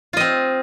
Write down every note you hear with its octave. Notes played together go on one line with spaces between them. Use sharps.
C4 F4 D#5